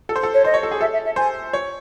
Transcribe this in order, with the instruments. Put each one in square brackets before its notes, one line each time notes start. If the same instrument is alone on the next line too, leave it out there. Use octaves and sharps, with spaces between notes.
[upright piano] A4
C5
A4
[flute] C#5
[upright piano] C5 [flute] D#5
[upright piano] C#5
A4
G#4
[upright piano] A4 [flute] E5
[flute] E5
E5
[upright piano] C5 [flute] G#5
[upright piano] C#5